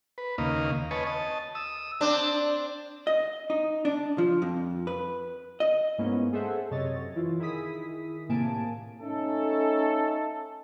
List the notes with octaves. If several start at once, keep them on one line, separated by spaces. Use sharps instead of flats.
B4
D#2 C#3 A#3 D#5 F5
B4 C#5 D#5 G#5 A5
D#5 A5
D#6 E6
C4 D4
D#5
D#4
D4
F3
F2
B4
D#5
G#2 G#3 A#3 B3 C#4 E4
G#4 A4 C5 E5 F#5
F#2 C3 C#5 D#5 A6
E3 E4 F4
D#3 E4 G#4 D#6 B6
A2 C3 A#3 G#5 A5 D7
A3 C#4 D#4 A4